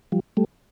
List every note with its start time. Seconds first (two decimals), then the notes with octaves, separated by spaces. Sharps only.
0.12 F3 G3
0.37 G3 A3